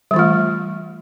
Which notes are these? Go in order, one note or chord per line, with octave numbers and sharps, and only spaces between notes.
E3 G3 A3 F4